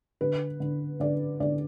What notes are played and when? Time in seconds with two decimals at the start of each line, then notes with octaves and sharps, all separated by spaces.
0.21 D3 B4
0.60 D3
1.00 D3 D5
1.40 D3 D5